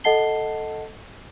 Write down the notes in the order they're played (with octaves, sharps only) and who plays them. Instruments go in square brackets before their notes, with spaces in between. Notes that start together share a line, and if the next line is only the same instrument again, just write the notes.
[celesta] A4 D#5 F#5 A5 C7 G7